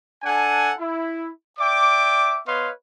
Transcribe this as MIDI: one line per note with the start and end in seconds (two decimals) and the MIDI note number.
0.23 0.73 62
0.23 0.73 69
0.23 0.73 78
0.23 0.73 80
0.79 1.29 64
1.59 2.39 74
1.59 2.39 76
1.59 2.39 79
1.59 2.39 86
2.46 2.69 59
2.46 2.69 71
2.46 2.69 73
2.46 2.69 75
2.46 2.69 77
2.46 2.69 84